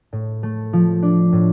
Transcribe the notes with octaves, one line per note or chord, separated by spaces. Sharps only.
A2
A3
F3
D4
A2